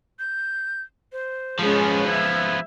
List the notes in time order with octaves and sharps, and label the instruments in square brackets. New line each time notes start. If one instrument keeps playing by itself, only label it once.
[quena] G6
C5
[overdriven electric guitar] F3 B3 [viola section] G#3 C#4
[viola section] E5 [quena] G#6